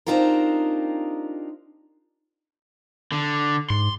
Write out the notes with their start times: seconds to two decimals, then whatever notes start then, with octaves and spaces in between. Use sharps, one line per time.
0.07 C4 D4 D#4 F4 G4 A#4
3.12 D3
3.70 G#2 C6